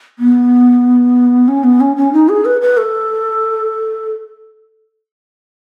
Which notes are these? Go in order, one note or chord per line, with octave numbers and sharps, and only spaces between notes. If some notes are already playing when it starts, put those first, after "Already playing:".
B3
C#4
B3
C#4
C#4
D#4
G#4
B4
B4
A4